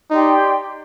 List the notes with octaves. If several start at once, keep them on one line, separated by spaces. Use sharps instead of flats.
D#4 G4 D5 G5 C6